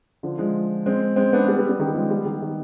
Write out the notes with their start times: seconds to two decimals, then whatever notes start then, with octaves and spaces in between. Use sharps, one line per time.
0.23 D3 F3
0.38 F3 G#3
0.86 G#3 C4
1.16 G#3 C4
1.33 B3 D4
1.48 G3 B3
1.58 G3 B3
1.69 G3 B3
1.79 D#3 G3
1.94 F3 G#3
2.10 G3 B3
2.25 D#3 G3
2.42 D#3 G3